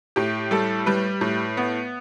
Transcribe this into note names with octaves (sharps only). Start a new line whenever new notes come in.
A2 G4
G3 A4
G3 B4
A2
B3